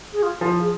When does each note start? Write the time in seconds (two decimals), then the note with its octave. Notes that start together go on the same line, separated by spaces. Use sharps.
0.13 G#4
0.23 F4
0.41 F3 E4
0.60 G#4